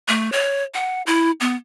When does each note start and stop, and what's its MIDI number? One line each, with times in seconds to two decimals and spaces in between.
0.08 0.32 57
0.32 0.63 73
0.74 1.02 78
1.07 1.31 64
1.40 1.55 59